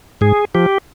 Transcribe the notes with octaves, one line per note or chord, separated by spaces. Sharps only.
G#2 G#4
F3 G4